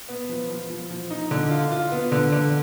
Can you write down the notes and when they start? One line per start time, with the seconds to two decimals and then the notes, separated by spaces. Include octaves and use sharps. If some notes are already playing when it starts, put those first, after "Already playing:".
0.09 B3
0.29 F3
0.50 F3
0.70 F3
0.90 F3
1.10 D#4
1.31 D3
1.51 F4
1.72 F4
1.92 B3
2.12 D3
2.32 D3